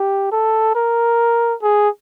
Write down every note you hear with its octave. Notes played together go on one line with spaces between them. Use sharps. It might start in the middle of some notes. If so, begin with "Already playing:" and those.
Already playing: G4
A4
A#4
G#4